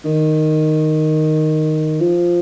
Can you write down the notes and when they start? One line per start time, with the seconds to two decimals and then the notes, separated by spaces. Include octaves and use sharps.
0.05 D#3
2.00 F3